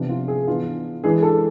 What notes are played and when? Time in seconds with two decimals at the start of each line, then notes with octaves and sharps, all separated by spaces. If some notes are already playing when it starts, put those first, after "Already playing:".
Already playing: C3 F3 B3 D4
0.09 F4
0.28 G#4
0.47 E3 B3 D4 F4
1.04 E3 G#3 D4 G#4
1.23 A4